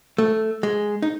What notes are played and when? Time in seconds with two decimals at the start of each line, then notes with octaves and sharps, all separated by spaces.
0.18 A3
0.63 G#3
1.02 D#4